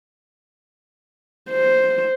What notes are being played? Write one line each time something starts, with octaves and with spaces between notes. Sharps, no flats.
C5